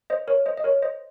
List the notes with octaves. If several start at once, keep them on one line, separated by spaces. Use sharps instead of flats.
C5 D#5
A#4 C#5
C5 D#5
D#5
A#4 C#5
C5 D#5